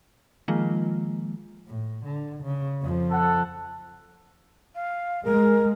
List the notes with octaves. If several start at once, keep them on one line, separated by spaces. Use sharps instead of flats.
D#3 F3 G#3 A#3 F4
A2
D3
C#3
F2 F3
A4 F#5
F5
G#3 A#4